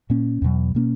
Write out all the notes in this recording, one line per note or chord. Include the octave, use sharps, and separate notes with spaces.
A#2 A#3 C#4
E2 B2 F#3
B2 A#3 C#4